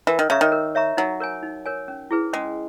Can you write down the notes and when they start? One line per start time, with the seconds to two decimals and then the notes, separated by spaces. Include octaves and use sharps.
0.07 E3 A#4
0.19 D#3
0.30 C#3 C#5 E5 A#5 C#6
0.41 D#3
0.52 A#4
0.75 C#5 E5 A#5 C#6
0.97 F#3 D#4
1.20 A#4 C#5 G#5
1.43 D#4
1.65 A#4 C#5 G#5
1.88 C#4
2.11 E4 G#4 B4
2.33 G#3 C#4